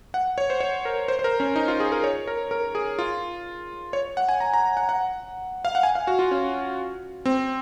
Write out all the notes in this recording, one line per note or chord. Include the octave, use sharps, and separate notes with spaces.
F#5
C#5
C5
C#5
A#4
C5
C5
A#4
C#4
D#4
F4
G#4
A#4
C#5
A#4
A#4
G#4
F4
C#5
F#5
G#5
A#5
A#5
F#5
F#5
F5
F#5
G#5
F5
F#4
F4
C#4
C4